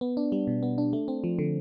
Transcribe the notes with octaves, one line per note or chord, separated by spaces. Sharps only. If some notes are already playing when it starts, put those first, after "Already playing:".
B3
D4
G3
B2
B3
D4
A3
C4
F3
D3